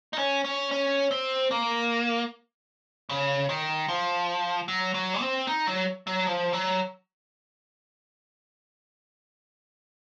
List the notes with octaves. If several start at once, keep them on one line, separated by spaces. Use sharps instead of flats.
D#4
C#4
C#4
C#4
C4
A#3
C#3
D#3
F3
F#3
F#3
C4
D#4
F#3
F#3
F3
F#3